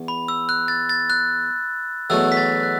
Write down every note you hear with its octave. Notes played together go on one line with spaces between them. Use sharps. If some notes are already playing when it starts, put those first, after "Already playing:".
Already playing: E2
B5
E6
F#6
A6
A6
F#6
E2 B2 F#3 A3 E6
B6
A6
F#6